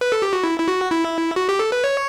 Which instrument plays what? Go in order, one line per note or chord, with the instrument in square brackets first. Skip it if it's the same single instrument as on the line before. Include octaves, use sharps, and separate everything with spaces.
[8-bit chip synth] B4
A4
G4
F#4
E4
E4
F#4
E4
F#4
G4
A4
B4
C#5